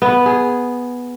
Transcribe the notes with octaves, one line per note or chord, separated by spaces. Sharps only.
B3
G#4